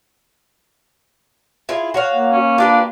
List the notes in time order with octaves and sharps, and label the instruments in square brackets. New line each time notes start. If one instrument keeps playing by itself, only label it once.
[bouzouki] E4 F4 G#4
F#4 C#5 F5
[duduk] A#3
[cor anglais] C#4
[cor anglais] D4 [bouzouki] F4 G4 B4